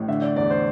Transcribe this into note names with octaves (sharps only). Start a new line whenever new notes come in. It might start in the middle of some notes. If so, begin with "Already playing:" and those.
Already playing: A1 A2
D3 E5
D5
E2 D5
C5